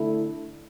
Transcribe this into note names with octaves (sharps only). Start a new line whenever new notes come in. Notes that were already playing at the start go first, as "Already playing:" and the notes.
Already playing: D3 A3 E4